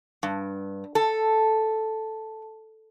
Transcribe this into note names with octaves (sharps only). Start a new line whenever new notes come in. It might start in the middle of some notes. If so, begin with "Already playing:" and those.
G2
A4